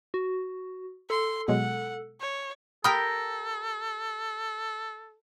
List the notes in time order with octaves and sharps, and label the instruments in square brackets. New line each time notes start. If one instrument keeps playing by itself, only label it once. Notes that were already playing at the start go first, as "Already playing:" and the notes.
[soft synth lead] F#4
[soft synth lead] A4 [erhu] C6
[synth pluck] B2 F#3 G#3 [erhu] F#5
[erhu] C#5
[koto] G4 A#4 G5 [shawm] A4 [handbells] B5 D#6 F6